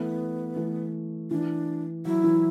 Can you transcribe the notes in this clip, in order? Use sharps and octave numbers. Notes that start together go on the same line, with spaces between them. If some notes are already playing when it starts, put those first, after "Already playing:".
Already playing: E3 A3 B3
E3 A3
E3 D4
F#3 E4
E3